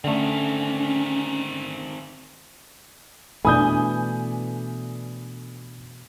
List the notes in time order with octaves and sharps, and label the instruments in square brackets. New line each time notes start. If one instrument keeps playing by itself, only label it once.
[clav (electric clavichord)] D3 A3 [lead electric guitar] D#3 C4 [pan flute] C#4
[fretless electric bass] B2 E3 A3 [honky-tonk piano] D4 G#5 [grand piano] B5 D#6 G6